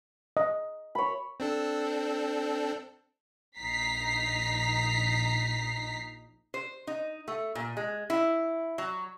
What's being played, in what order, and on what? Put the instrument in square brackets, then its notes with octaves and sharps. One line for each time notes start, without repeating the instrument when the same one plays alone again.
[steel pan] D#5
[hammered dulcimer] C#5 B5
[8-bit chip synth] C4 D4 A4
[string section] A#1 D#4 A#5 B6 C7
[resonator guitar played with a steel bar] C5
D#4
A3
A#2
G#3
E4
F#3